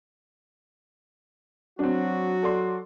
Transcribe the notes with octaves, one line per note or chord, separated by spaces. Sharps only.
F#3 C4 D4 F#4
A4 D5 C6